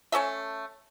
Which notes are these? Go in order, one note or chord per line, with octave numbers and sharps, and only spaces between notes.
A3 C#4 A4 E5